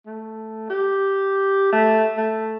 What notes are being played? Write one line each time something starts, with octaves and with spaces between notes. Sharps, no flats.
A3
G4
A3
A3